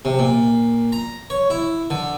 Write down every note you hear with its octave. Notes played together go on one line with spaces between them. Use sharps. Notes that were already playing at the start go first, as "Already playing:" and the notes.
C3
A#2
A#5
C#5
E4
D3